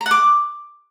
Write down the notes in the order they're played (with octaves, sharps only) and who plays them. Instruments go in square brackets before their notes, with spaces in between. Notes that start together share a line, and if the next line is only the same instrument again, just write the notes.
[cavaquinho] A#5
F#5
D6